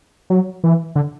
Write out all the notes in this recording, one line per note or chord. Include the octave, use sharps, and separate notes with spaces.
F#3
E3
D3